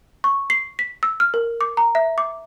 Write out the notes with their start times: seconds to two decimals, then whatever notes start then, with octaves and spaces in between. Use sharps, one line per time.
0.24 C#6
0.50 C7
0.79 B6
1.03 E6
1.20 F6
1.34 A#4
1.61 D6
1.77 A#5
1.95 E5
2.18 D6